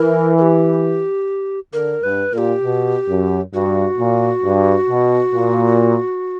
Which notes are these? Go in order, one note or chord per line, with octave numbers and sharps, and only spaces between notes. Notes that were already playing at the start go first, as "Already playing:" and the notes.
Already playing: E3 A#4
A#4
G4
D3 A#4
G2 B4
A#2 A#4
G4
B2
F#2
G2 F#4
A#2
G2
B2
A#2